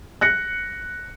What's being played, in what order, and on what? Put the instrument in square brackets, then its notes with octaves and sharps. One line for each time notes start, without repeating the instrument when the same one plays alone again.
[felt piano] F#6 A#6 C#7